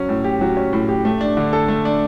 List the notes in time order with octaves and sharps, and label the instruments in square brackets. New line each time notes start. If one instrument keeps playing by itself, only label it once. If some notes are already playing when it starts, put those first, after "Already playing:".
Already playing: [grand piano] F#3 C#4
A2
G4
F#3
C#4
A2
G4
A3
D4
D3
A4
A3
D4